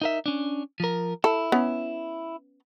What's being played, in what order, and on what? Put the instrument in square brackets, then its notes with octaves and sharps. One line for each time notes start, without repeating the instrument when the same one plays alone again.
[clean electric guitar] D#4 A#4 E5
C#4 D4
F3 A#4
[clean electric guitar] E4 [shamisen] A4
[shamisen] B3 C#4